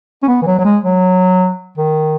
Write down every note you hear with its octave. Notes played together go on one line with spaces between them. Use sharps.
C#4
B3
E3
F#3
F#3
G#3
F#3
D#3